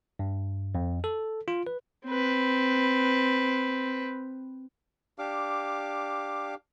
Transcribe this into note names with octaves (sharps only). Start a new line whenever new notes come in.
G2
F2
A4
F4
B4
C4 B4
D4 G4 F5 D6